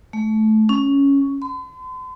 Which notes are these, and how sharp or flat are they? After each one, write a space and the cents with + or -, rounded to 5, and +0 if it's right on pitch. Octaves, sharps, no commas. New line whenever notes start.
A3 -20
C#4 +5
C6 -45